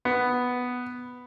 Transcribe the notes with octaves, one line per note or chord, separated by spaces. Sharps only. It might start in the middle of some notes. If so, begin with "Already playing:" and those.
B3